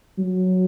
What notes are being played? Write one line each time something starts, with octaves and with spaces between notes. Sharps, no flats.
F#3